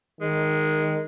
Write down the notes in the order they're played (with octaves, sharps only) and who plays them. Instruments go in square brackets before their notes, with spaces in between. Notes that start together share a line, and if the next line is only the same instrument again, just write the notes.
[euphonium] D#3 [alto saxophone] G#3